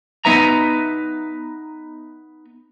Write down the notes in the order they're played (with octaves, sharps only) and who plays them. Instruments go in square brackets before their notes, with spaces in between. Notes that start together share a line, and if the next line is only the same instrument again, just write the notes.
[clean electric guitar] B3 D#4 B4 E5 A#5